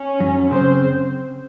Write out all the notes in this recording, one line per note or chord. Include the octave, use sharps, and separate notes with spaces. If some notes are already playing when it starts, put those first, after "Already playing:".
Already playing: C#4
F#2
C#3 C4 C5